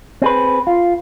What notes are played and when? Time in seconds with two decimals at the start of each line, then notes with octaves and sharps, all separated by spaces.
0.22 C4 G#4 B4
0.67 F4